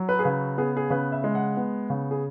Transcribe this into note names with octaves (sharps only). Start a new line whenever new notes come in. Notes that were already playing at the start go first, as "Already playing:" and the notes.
Already playing: F#3
B4
G#4
C#3 B4
B3 G#4
G#4
C#3 B4
E5
G#3
F#5
B3
C#3
G#4